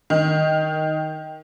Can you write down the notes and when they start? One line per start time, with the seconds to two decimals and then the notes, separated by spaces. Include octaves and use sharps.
0.10 D#3